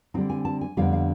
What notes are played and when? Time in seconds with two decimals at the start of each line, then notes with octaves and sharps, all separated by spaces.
0.14 D3 G3 C4 D#4
0.30 G#5
0.45 A5
0.61 G#5
0.77 F2 D3 G3 B3 F5
0.93 F5